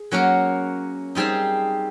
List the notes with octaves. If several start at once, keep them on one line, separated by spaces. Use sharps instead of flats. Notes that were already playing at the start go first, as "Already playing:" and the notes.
Already playing: G#4
F#3 A#3 C#4 F#4 A#4
G3 C4 D#4 G#4 C5